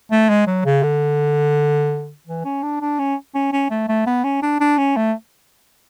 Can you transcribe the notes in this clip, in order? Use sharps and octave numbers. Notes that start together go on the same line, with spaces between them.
A3
G#3
F#3
C#3
D3
E3
C#4
D4
D4
C#4
C#4
C#4
A3
A3
B3
C#4
D4
D4
C#4
A3